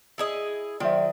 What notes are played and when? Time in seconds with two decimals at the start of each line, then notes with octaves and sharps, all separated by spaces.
0.18 E4 G#4 D#5
0.80 D#3 F#3 F4 C5 D5 E5 G5